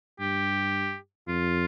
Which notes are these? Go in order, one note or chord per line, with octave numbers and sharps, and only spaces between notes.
G2 G4
F2 F4